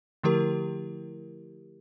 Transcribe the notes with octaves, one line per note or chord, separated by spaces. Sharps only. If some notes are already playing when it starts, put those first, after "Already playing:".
D3 F3 A3 E4 G4 A#4